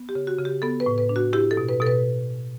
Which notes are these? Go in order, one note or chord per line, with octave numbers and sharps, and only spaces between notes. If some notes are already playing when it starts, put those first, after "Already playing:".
Already playing: B3
G4
C#3
F#4
C#3
G4
B3 A4
B4
A2
B4
D4
F#4
E4 G4
A4
B2
B4
B2 A4
B4